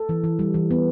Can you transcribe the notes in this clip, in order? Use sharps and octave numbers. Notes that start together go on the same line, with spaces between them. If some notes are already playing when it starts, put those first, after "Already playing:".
Already playing: A4
E3
E3
G3
E3
B3